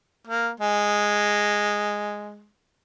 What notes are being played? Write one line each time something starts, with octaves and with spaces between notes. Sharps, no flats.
A#3
G#3